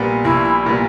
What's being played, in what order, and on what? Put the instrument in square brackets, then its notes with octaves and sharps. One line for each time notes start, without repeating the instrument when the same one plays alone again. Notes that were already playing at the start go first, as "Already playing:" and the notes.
Already playing: [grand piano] A#1 A#2 G3 B3
[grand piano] A#1 [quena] E4
[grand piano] A#2 G3 B3